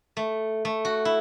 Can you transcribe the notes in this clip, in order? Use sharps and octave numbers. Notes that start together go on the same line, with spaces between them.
A3
A3
F#4
E4